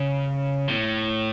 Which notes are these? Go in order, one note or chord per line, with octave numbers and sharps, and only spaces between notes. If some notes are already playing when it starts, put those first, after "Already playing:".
Already playing: C#3
A2